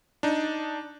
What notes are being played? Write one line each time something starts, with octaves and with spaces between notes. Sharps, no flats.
D4 D#4